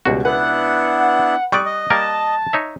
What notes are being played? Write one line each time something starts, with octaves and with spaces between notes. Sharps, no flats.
C#2 B2 G3 F#4
B3 D4 E4 B4 F#5
G3 D5 C#6 D#6 F#6
D#5
G3 A#3 A#4 A5
D#4 C#5 E5